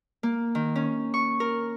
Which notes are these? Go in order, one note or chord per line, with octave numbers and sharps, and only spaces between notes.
A#3
D#3
C#4
C#6
A#4